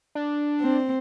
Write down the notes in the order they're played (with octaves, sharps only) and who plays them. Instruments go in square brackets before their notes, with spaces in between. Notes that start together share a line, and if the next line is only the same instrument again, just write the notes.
[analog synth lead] D4
[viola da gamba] C4